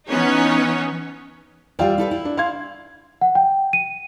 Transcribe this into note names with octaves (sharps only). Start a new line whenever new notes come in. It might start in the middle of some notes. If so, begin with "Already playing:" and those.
E3 B3 C#4 D#4 C#5
G3 F4 D5 E5 F5 G5
E4 A4 B4
E4
D4
F5 C6 G#6
F#5
G5
D#7